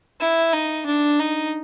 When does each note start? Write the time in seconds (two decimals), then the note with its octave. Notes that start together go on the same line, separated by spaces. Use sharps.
0.21 E4
0.53 D#4
0.86 D4
1.19 D#4